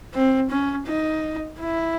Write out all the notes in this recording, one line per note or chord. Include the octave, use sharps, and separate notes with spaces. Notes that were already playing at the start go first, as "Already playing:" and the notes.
C4
C#4
D#4
E4